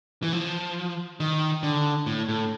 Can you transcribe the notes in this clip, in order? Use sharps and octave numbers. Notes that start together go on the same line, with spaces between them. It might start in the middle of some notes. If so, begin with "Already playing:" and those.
E3
F3
D#3
D3
A2
A2